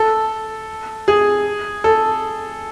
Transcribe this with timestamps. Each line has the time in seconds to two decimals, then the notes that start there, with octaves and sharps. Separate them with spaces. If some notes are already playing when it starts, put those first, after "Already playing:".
Already playing: A4
1.08 G#4
1.84 A4